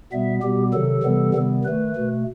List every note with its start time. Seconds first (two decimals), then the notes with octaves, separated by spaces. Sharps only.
0.12 B2 G3 B3 E5
0.42 B2 G3 B3 G4
0.73 C3 D#3 F#3 A4
1.03 C3 E3 G3 B3
1.34 C3 D#3 G3 B3
1.64 D#3 A3 B4
1.95 B2 A3